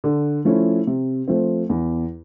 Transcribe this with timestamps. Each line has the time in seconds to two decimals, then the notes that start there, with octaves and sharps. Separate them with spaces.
0.04 D3
0.45 F3 A3 C#4 E4
0.87 C3
1.28 F3 A3 C4
1.70 E2